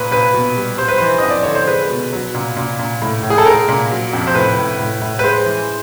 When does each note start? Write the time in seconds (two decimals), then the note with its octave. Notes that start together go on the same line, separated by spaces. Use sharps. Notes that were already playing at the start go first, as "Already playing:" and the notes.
Already playing: A#2 B4
0.11 A#2 B4
0.34 B2
0.57 G3
0.78 G3 C5
0.88 B4
0.98 E3 C5
1.19 F2 D#5
1.30 D5
1.43 D3 C#5
1.55 C5
1.67 G#3 B4
1.90 B2
2.13 F#3
2.35 A#2
2.57 A#2
2.79 A#2
3.02 A2
3.23 A2
3.30 G#4
3.38 A4
3.46 G#3 A#4
3.69 A#2
3.90 F#3
4.13 F2
4.27 C5
4.35 A2 B4
4.57 A2
4.79 A2
5.01 A2
5.19 B4
5.24 G#3 C5
5.46 E3